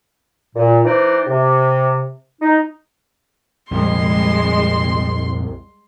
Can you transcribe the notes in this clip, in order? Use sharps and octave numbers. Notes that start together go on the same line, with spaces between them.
A#2
E3 D#4 B4 C5 D5
C3
D#4
C2 F2 A#2 F3 G3 G#3 C6